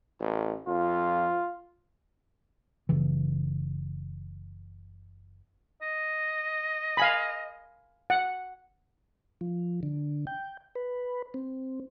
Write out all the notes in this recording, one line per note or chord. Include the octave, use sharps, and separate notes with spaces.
A1
F2 F4
F#1 C#3 E3
D#5
F5 G#5 B5
F#5
F3
D3
G5
B4
C4